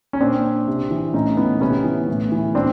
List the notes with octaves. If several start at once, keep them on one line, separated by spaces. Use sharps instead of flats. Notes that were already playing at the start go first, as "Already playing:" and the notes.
C#4
A#2 C4 D4
C3
E3
A2 C#4 D#4
E3 B3 C#4
C3 B3 C#4
E3
A2
E3
B2 C4 D4